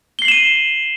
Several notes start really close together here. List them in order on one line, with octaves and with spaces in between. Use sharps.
G7 C7 F#7 E7 D#7